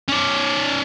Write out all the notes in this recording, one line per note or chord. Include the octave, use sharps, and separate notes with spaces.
C#4 D5